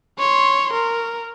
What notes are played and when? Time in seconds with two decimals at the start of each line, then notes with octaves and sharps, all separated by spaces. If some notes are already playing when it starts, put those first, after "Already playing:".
0.19 C#5 C6
0.73 A#4